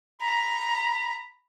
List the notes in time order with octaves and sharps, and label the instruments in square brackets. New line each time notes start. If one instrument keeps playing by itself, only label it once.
[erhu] A#5 [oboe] B5